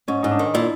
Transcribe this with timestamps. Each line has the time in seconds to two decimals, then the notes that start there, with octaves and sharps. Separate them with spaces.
0.08 G#2 C#4
0.22 G#2 D#4
0.31 D4
0.39 D#3
0.54 A#2 E4